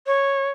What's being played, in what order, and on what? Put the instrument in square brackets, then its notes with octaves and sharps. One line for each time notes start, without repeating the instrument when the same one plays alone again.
[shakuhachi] C#5